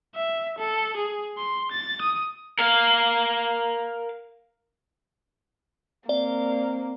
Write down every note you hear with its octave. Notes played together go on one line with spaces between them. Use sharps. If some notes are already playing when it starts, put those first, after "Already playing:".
E5
A4
G#4
C6
A6
D#6
A#4 F5
A#3 C4 D5